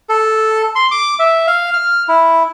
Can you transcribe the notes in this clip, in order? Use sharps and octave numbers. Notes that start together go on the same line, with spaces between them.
A4
C6
D6
E5
F5
F6
E4